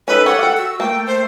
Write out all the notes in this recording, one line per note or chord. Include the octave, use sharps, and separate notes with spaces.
C#4 D#4 A4 B4
G4 C#5 F#5
F5 G5
F#4 E6
A3 A#3 G5
C5